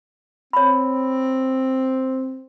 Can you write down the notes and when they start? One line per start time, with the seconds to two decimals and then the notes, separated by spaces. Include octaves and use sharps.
0.53 C4 C#5 B5